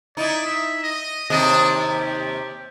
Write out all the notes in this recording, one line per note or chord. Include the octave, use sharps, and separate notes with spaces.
D#4 E4 D5
E5
D#5
D#2 C3 D4 D#5
G4